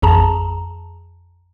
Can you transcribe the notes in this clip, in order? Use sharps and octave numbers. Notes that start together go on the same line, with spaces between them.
A1 F2 G#4 A5 A#5